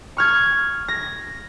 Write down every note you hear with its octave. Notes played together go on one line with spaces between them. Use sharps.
C#6 F6 G#6
A#6